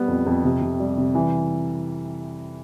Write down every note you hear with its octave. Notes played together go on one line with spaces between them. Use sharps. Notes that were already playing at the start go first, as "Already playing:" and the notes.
Already playing: G3 B3
F2
F2
C3
C3
G3
C3
E3